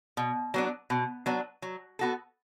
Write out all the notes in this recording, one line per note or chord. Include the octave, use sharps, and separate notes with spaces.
B2
F#3 B3 D4
B2
F#3 B3 D4
F#3
B3 F#4 A4